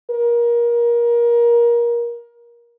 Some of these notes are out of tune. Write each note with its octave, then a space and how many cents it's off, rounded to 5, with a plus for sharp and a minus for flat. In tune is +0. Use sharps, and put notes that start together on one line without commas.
A#4 +25